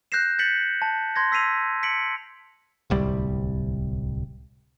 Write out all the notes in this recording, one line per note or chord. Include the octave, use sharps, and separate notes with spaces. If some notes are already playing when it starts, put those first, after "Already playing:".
F#6 G6 A#6 C7 E7
G6 A6 B6 C#7 F#7
A5
C6 G#6 A#6
E6 B6 C7 D#7 F7
B6 C#7 D7 F#7
D1 C2 G3